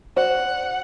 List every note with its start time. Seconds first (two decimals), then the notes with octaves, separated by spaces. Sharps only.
0.16 F#4 C5 D5 F#5